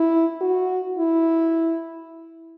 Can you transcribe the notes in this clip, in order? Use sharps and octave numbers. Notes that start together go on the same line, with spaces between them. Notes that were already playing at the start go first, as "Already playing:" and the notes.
Already playing: E4
F#4
E4